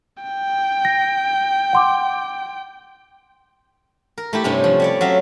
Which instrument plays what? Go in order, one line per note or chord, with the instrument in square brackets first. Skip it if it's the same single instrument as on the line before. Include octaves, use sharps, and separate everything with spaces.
[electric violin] G5
[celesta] A#6
F#5 C6 D6
[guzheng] A#4
A3 E4 G4
G2 C3 A3 C#4
F3
G3 C#5 D5
F#3 C#4 E5 F5